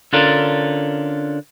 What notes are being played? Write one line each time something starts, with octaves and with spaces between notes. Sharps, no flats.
D3 C#4 D4 F4 A4 A#4